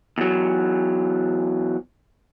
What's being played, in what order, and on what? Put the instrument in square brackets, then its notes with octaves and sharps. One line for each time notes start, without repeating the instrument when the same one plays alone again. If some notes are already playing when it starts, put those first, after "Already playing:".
[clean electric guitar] E2 F#3